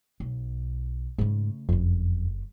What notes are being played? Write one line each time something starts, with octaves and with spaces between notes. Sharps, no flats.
B1
G#2 C#3 A3
F#1 F2 D3